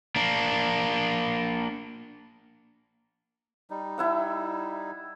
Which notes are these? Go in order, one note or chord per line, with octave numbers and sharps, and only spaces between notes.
A#3 D4
G3 D#4
E4 E5 F#5